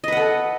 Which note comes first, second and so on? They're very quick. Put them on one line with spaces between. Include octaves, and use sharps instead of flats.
D#5 B4 F#5 A4